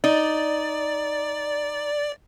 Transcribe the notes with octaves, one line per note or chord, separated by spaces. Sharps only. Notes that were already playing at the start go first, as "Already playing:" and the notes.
D#4 D5